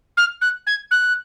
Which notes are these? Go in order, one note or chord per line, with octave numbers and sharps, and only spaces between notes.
F6
F#6
G#6
F#6